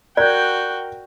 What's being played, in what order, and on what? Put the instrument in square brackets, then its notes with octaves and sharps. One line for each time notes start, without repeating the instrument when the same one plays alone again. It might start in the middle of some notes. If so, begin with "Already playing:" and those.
[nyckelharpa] F#4 G5 [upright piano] A#4 [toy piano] D5 [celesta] F#6 G6